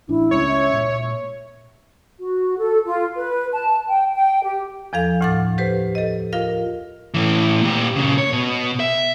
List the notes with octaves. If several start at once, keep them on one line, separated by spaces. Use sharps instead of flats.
A1 D4 E4
C#2 G#3 C#4 C#5
E5
A#2
F#4
A4
F4
B4
A5
G5
G5
G4
E2 F3 A4 F5
D2 A2 F#5 D6 A6
G4 B4 C5
A4 D#5
F4 A#4 F5
A2 E3
A#2 G4
A#2 C#3
C#5
B2
E5